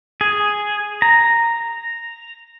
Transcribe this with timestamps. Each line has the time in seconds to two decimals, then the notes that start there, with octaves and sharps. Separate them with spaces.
0.21 G#4
1.02 A#5